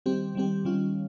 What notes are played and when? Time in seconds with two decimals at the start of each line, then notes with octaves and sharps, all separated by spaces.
0.06 D#3 G3 C4 G4
0.35 D#3 G3 C4 G4
0.65 D#3 G3 C#4 F4